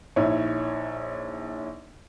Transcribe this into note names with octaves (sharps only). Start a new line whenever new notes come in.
A#1 D#4 E4 C#5